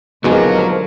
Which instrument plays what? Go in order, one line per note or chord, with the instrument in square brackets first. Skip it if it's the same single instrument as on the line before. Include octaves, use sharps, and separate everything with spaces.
[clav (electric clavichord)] D#2 B2 G#3 [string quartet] D3 F3 A#4 [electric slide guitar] F#3